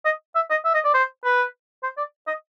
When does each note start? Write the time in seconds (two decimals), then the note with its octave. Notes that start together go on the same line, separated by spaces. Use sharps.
0.05 D#5
0.35 E5
0.50 D#5
0.65 E5
0.74 D#5
0.84 D5
0.94 C5
1.24 B4
1.83 C5
1.97 D5
2.27 D#5